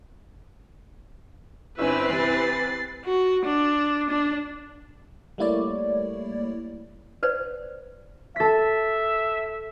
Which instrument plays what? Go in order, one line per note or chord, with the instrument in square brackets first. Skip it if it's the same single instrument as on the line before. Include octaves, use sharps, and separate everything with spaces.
[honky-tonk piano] G1 C#4 [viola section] C4 B4 [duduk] E4 [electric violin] G#5 E6
[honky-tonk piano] C3 E3 [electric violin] A6 C7
[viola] F#4
D4
D4
[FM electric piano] G3 A3 A#3 E4 C#5 D5
[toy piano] B4 C5 D5
[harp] A4 B6 [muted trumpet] E5